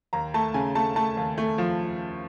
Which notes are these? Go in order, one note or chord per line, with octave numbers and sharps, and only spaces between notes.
D#2 A#5
A3 A5
C#3 G#5
A3 A5
A3 A5
D#2
A3
F3